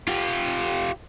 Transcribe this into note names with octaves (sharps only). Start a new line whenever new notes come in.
F4 G4